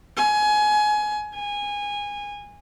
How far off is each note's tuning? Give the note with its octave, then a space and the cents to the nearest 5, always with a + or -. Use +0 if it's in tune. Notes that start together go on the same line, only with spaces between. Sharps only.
G#5 +25
G#5 -20